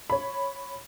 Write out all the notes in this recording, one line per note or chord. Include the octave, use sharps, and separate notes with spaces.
C#5 B5